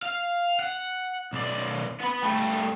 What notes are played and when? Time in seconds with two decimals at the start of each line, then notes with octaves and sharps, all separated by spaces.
0.02 F5
0.59 F#5
1.33 B1 D5
2.00 B3 B5
2.23 G3 A3